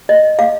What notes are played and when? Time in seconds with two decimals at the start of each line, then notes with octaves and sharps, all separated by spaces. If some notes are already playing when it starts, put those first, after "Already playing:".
0.09 D#5
0.39 F5